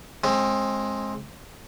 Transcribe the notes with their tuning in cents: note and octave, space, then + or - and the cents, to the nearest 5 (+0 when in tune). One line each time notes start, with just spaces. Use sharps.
G#3 +20 C4 +35